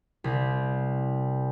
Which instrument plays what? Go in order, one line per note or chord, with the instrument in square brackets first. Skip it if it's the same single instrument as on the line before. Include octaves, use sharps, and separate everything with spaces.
[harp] C2